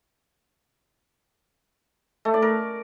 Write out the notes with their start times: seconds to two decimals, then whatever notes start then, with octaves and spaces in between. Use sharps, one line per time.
2.25 A3
2.34 D5
2.42 A#4